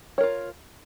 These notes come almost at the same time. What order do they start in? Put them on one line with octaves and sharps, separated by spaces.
C#5 A#4 F4